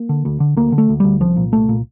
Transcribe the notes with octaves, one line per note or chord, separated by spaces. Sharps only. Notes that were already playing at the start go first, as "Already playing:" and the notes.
Already playing: A#3
D3
D2
D3
D2 A#3
D3
A3
D2
D2 G3
C2 F3
A#2
C2 A3
A#2